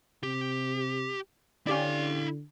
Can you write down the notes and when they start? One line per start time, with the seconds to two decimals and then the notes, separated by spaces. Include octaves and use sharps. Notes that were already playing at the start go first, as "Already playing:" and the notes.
0.23 C3 G4
1.67 D3 C#4 E4 G4 D5 F5